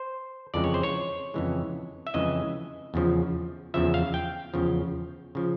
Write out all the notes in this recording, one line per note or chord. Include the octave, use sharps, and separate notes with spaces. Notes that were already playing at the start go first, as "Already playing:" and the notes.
Already playing: C5
F2 C#3 E3 G#3 D5
C#5
C5
C#5
F2 C#3 E3 G#3
E5
F2 C#3 E3 G#3 D#5
E2 C#3 F3
E2 C#3 F3 E5
F5
G5
E2 C#3 F3
C#3 F3